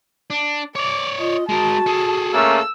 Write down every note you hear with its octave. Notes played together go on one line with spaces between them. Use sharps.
D4
C#5 D5 D6
F4 D#5
G#3 F#4 A#4 A5
G#4 A4
A3 A#3 C#4 E6